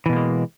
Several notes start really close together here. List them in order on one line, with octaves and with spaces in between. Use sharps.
E3 B2 A#3 G#3